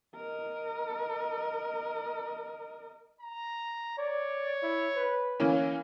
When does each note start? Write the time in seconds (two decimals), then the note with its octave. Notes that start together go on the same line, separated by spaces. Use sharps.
0.16 A#4 D#5
3.21 A#5
3.99 C#5 D5
4.63 E4
4.96 B4
5.40 E3 A#3 C#4